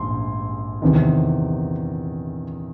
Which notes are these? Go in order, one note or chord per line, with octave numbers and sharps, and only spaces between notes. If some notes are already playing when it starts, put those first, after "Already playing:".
Already playing: A#1 G#2 C6
E2 C3 D#3